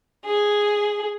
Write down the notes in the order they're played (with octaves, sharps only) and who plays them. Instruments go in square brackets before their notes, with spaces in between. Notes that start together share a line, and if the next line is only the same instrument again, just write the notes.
[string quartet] G#4